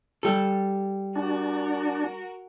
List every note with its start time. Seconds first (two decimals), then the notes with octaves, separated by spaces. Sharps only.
0.23 G3 A4
1.16 D4 F#4 A#4